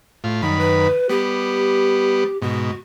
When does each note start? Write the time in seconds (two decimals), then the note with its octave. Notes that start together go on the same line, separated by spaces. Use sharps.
0.24 A2 F4
0.42 F#2 D#3 G3 B5
0.59 B4
1.09 G3 B3 G4
2.42 G#2 B2 F#4